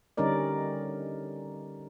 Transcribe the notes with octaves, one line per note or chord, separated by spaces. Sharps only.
D3 G3 C#4 D#4 A#4 D5